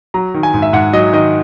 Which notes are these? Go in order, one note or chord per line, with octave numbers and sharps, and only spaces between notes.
F#3 A#5
D#3
G#5
G#2
E5
G#2 F#5
F#3 D#5
D#3 D#5